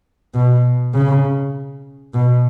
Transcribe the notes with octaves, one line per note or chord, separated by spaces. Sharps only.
B2
C#3
B2